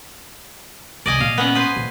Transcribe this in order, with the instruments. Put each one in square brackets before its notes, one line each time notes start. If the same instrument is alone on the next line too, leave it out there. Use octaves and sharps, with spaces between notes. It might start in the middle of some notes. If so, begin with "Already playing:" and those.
[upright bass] C2 [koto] D5 D#5 G#5
[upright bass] A#2 [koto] F5
[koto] B3 C#4 F#5
B4 C5 G#5
[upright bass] A#2